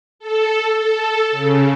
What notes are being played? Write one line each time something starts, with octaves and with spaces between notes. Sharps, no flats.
A4
A4
C#3